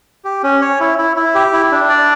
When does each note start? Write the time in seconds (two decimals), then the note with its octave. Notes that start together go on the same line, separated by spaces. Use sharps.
0.25 G4
0.43 C#4
0.61 C#5
0.80 E4
0.99 E4
1.16 E4
1.35 G4
1.53 E4
1.72 D4
1.90 D5